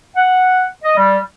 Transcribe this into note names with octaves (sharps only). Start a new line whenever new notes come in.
F#5
D#5
G3